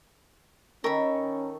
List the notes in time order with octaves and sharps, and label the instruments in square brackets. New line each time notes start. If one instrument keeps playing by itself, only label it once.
[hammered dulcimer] D#3 A4 C#6 [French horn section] C#4 [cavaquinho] A#4 B5